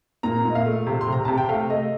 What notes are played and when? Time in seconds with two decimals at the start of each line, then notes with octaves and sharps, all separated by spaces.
0.23 A#2 A#5
0.45 A#2 D#5
0.55 F5
0.66 A3
0.87 C3
1.01 C6
1.08 C3 A#5
1.25 C3 A5
1.37 G5
1.49 A3 F5
1.70 A3 D#5